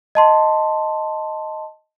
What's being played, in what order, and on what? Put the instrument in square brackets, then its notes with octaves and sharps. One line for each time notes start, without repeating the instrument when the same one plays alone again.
[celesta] D#5 A5 C6